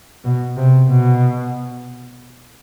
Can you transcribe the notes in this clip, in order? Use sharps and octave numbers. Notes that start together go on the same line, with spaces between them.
B2
C3
B2